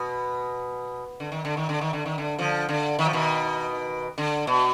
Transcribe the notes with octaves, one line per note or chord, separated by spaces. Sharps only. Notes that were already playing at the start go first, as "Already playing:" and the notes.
Already playing: B2
D3
D#3
D3
D#3
D3
D#3
D3
D#3
D3
D3 F3
D3
D#3
F3
B2 D#3
D3
B2